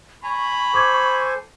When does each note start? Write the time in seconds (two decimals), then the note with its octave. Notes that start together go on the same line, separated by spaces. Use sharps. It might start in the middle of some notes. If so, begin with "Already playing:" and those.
0.23 G#5 A#5 B5 C#6
0.74 A4 C5 G#5 D6 G#6